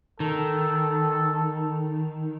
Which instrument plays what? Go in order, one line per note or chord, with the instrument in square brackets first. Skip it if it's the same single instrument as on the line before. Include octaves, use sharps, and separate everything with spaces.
[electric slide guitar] D#3 [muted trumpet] A4